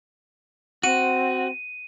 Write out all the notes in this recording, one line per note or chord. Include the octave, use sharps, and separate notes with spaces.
C4 F#4 D#7